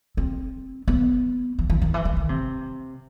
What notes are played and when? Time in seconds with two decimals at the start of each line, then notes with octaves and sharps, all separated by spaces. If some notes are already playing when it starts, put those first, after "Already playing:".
0.17 C4
0.88 B3
1.59 E3
1.70 E3
1.82 D#3
1.94 E3
2.05 D#3
2.17 D#3
2.29 C3